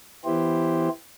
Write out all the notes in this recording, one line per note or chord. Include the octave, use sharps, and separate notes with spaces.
E3 B3 E4 G4 C5